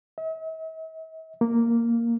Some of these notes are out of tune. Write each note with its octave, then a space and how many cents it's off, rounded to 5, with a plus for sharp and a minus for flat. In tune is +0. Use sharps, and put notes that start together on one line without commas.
E5 -45
A#3 -5